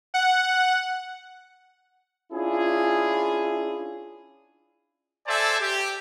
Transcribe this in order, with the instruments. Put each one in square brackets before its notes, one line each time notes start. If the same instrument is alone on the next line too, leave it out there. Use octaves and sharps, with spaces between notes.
[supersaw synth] F#5
[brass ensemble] C#4 D4 E4 F4 G#4
[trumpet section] A4 C5 D5 E5 G#5 A5
G4